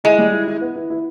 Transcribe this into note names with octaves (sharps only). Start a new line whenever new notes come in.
G#3 E4
G3
E4
E4
B3
E4
E4